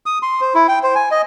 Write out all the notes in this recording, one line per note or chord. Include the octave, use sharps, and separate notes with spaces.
D#6
C6
C5
E4
G5
C5
G#5
D#5